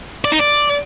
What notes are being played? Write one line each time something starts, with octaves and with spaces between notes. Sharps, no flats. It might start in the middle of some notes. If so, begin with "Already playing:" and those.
D5
D#4
D5